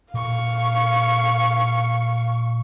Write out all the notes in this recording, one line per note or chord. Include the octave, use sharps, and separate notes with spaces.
A#2 F5 C#6